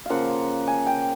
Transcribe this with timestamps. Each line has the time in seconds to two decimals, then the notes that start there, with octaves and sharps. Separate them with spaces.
0.06 C#3 F3 A#3 F5 F#5
0.67 G#5
0.86 G5